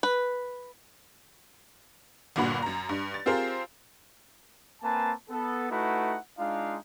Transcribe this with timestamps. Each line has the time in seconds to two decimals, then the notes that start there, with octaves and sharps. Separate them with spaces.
0.03 B4
2.36 G1 G2 A#2 F#4 B5
2.62 F#2 A#5
2.89 G2
3.14 A6
3.26 C4 F4 G4 G#4 A#4 C5
4.82 A#3 C4 B4 G#5 A5
5.30 B3 A4
5.70 A3 D#4 E4 F#4 B4 F#5
6.39 G#3 D4 D#4 F4 F5